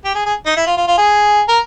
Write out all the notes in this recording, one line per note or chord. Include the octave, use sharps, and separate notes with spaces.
G4
G#4
G#4
D#4
E4
F4
F4
F4
G#4
A#4